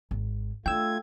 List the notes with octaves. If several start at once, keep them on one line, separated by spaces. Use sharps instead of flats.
G#1
A3 D4 F4 G5 E6 G#6